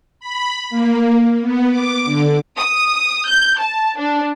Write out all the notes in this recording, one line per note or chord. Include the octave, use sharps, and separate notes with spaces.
B5
A#3
B3
D6
D3
D#6
G6
A5
D4